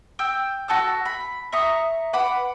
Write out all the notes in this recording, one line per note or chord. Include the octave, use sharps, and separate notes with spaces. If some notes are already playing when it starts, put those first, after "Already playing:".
G5 E6
F#4 A4 A5 E6
B5
E5 A#5 C#6 D#6
B4 F#5 B5 D6